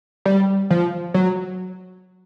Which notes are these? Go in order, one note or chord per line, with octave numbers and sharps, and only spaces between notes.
G3
F3
F#3